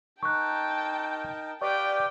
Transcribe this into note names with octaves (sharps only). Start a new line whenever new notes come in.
D#4 A#4 G5 A5 C#6 F#6
G4 B4 D5 F5 G5 C#6